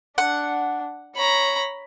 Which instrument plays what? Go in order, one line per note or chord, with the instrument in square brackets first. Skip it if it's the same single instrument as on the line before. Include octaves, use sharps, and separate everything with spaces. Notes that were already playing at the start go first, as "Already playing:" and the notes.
[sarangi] D4 [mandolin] F#5
[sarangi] C#5 [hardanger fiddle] A#5 B5